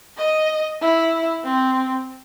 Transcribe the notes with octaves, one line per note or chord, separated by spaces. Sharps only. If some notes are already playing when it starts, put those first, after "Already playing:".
D#5
E4
C4